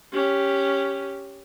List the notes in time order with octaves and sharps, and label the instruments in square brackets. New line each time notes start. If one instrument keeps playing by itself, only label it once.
[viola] C#4 G4